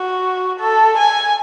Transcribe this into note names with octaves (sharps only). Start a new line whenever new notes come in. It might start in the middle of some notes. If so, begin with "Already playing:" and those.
Already playing: F#4
A4
G#5